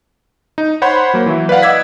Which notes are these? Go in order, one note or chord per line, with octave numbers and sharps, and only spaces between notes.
D#4
C5 C#5 F#5 B5 C6 G6
F#3 A#3
E3 F#3 E4
B4 D5 F5 F#5
D#5 F#5 D6 E6 G#6 B6